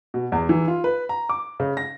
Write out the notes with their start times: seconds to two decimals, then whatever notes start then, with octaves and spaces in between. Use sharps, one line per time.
0.14 B2
0.32 E2
0.49 E3
0.68 F4
0.84 B4
1.09 A#5
1.29 D6
1.60 C#3
1.77 A#6